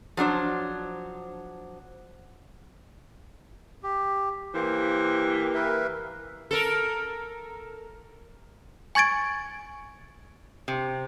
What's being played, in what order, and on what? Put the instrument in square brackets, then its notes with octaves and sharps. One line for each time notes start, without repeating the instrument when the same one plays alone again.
[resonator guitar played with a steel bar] F3 F#3 D4 C5
[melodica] G4
[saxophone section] E3 A#3 G4 [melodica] C5
[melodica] A#4 B4 E5
[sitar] A4 A#4
[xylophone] G#5 C#6 G#6 A6 D7
[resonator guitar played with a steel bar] C3